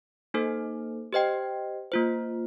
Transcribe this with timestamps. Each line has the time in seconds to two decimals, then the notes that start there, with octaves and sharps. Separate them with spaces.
0.34 A#3 D#4 A4 C5
1.13 G4 C5 D#5 G5
1.92 A#3 F4 C5